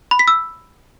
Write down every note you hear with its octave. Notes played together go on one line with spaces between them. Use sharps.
B5
B6
E6